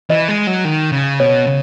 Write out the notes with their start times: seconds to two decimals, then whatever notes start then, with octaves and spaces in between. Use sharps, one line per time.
0.10 E3 D#5
0.28 G#3
0.47 F#3
0.65 D#3
0.92 C#3
1.20 B2 C#5
1.47 C#3